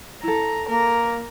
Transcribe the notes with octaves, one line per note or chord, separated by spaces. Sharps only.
E4 A4 A#5
A#3 A#4